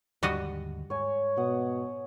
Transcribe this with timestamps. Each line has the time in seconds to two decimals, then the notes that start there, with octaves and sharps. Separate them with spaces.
0.23 D#2 G#2 D3 G3 F#4 D#5
0.90 G#2 C#5 G#5
1.37 B2 F#5 D#6